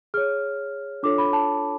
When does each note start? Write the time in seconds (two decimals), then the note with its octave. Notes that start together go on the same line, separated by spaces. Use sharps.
0.14 G#4 C#5 F6
1.03 D4 F4 A4 C#5 D6
1.18 B5
1.33 A5